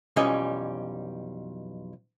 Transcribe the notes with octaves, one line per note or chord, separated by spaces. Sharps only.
B1 F2 E3 G3 C#4 D#5